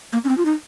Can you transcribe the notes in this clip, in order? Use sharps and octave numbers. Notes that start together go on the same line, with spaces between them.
A#3
C#4
C4
F4
D#4